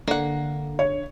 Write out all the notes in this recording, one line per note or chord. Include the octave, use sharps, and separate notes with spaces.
D3 A#3 F#5
C#5